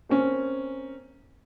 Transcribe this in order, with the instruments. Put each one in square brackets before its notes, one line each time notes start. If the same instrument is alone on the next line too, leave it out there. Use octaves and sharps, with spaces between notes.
[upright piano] A#3 C4 C#4